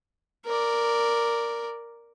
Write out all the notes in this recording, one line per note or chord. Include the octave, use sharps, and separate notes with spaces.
A#4 D5